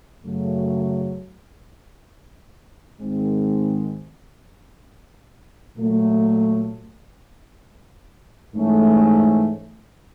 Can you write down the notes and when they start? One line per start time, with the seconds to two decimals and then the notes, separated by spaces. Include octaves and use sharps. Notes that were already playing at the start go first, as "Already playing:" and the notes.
0.24 F#2 C#3 F#3 A3
3.00 G#2 D#3 G#3 C4
5.77 A#2 F#3 A3
8.53 G#2 E3 A3 C#4